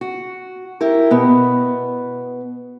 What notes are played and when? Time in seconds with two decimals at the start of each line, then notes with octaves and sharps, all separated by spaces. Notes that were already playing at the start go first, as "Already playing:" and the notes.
0.01 F#4
0.81 E4 G4 A#4
1.11 B2 B3